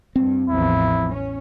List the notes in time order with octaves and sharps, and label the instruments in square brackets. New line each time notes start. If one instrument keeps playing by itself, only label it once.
[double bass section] G2 [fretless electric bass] C4
[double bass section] A1 E2 F3 [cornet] E4
[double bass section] C#4